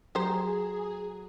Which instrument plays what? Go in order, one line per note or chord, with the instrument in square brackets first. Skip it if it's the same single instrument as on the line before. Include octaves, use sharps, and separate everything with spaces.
[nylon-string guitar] F#3 A3 [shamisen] G4 C5 [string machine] G#4 [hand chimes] A#5